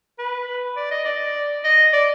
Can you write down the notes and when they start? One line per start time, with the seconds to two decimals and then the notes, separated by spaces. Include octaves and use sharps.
0.18 B4
0.76 D5
0.91 D#5
1.05 D5
1.64 D#5
1.93 D5